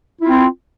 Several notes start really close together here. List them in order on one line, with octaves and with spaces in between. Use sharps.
E4 F4 C4